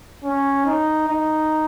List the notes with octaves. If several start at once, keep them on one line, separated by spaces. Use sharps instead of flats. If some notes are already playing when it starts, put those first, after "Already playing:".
C#4
D#4
D#4